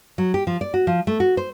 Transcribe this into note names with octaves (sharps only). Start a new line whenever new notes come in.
F#3
G4
F3
D5
F#4
F3
A3
F#4
C5